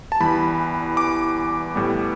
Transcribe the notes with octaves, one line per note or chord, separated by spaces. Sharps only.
A5
E2 E3 G3 B5
D6
A2 G3 B3